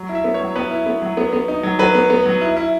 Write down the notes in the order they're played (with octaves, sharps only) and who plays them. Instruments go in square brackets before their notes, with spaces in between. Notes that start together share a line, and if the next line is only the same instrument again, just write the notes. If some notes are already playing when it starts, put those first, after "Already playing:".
Already playing: [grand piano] F#3
E4
E5
B3
C#5
F#3
B3 B4
E4
B3
F#3
B3
B3
D#4
F#3
F#3 B4
B3
B3
F#3
E4
E4